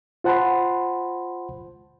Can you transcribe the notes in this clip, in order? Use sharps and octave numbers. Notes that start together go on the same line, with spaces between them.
F4 C5 F#5 A5 B5 C6